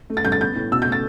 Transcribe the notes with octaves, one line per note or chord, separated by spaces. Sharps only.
A3
A6
G2 G6
A6
B3 G6
A2
B2 E6
A3 G6
A6